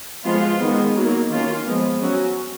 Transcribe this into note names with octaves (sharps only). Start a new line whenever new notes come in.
F3 G#3 B3 F4
D#3 G#3 B3
D#3 F#3 A#3 D#4
D#3 A#3 C#4 F4
F3 G#3 B3
F#3 C#4 F#4